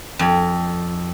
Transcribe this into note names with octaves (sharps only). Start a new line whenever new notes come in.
F2